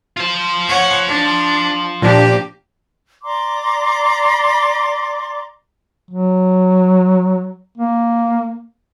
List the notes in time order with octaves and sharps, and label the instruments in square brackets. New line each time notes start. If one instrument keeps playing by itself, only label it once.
[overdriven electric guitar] F4 C5
[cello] C#5 F#5
D4
[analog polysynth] A#2 F3 D4 [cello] A#3 G4
[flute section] D5 A#5 C6 D6
[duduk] F#3
A#3